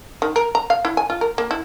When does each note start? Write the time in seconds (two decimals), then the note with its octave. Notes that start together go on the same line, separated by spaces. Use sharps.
0.22 D#3
0.36 A#4
0.55 A#5
0.70 F5
0.85 E4
0.97 G#5
1.10 F4
1.21 A#4
1.38 A#3
1.51 E4